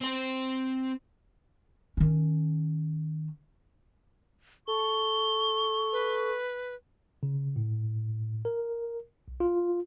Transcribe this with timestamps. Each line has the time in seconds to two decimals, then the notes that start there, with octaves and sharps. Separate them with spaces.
0.01 C4 C5
1.97 D#3 C#4
4.68 A4 C#6 G7
5.92 B4
7.23 C#3
7.56 A2
8.45 A#4
9.28 B1
9.40 F4